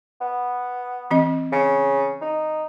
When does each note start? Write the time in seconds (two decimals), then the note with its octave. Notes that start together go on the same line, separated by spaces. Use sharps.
0.21 B3
1.11 E3 C4 D#5
1.52 C#3
2.21 D#4